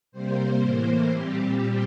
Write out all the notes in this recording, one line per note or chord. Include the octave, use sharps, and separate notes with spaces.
C3 G3 A#3 C5
A2 E3 A#3
A#2 G3 C4 G4